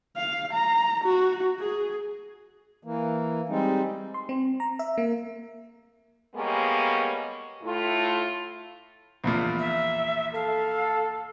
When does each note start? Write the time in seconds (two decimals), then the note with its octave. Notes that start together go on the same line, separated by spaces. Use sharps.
0.17 F5
0.53 A#5
1.04 F#4
1.60 G#4
2.84 E3 A#3
3.49 G3 G#3 C4 D#4
4.14 C6
4.29 C4
4.60 A#5
4.79 E5
4.98 A#3
6.36 G3 G#3 A#3 B3 C#4
7.62 A2 A3 E4 F4
9.24 A#1 E2 A#2
9.59 E5
10.34 A4 F5